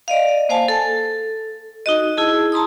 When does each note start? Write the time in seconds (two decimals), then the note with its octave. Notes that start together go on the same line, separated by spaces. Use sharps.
0.08 D5 D#5 F5
0.49 A#3 C5 F5 G#5 A5
0.68 A4
1.86 D#4 F#4 D#5
2.17 E4 G#4 A5
2.52 A5 A#5 C6 D#6